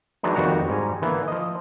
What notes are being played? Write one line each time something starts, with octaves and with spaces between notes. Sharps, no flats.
E3 F#3 G#3 D4 D#4
F2 D#3 G3 F#4 A#5
G#2 G3 G#5 A#5
D3 E3 A#3 B3
F3 D#5